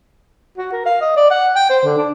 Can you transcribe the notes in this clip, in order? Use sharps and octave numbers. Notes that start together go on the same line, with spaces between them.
F#4
A#4
F5
D#5
D5
F#5
G5
C5
D3
D4